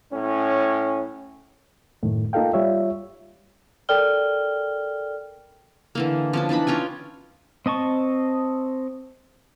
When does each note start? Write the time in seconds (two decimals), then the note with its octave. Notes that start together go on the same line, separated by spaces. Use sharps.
0.12 A2 C#4
2.03 F#2 A2 D#3 A3
2.33 A#3 D#4 F4 A4 F5 G5
2.53 G3 F4 C#5 E5
3.89 A4 A#4 D5 G5 F6 G7
5.95 D3 E3 A#3
6.33 F3 C#4 D4
6.49 E3 D4 D#4 B5
6.67 C#4 F4 G5 G#5
7.66 C4 D#5 A5 C#6